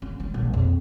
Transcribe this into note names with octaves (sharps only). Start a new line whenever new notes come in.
C#4
G3
A#1
F2